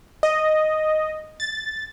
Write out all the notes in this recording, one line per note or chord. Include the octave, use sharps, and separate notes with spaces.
D#5
A6